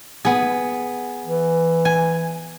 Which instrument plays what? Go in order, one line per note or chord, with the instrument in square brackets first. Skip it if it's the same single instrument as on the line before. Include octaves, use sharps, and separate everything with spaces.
[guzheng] B3 G#4
[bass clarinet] E3
[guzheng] G#5